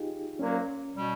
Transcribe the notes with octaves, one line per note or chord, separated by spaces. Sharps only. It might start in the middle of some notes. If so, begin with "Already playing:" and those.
Already playing: D#4 F4 G4 G#4
C2 A#2 F#3 A#3 C#4
B2 G3